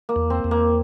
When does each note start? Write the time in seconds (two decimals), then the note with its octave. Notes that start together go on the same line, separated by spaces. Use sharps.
0.09 A#3
0.16 E2
0.30 C4
0.44 E2
0.51 A#3